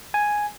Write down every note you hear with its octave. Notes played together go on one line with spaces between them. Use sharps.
G#5